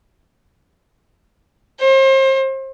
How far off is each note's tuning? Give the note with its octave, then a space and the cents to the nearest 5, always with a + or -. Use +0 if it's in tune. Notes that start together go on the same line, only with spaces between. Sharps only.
C5 +35